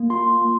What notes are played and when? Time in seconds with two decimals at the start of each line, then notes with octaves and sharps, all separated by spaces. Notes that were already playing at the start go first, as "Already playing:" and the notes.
Already playing: A#3
0.10 F4 C6
0.42 A#3